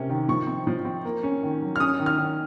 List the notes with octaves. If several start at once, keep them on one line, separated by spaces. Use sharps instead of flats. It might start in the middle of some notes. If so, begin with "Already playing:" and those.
Already playing: C3 A#3 C#4
D#3
F3 C#6
C4
F3
C4
A#3
C#4
D#3
F#3
F6
C#4 D#6
D#3
F6
D#3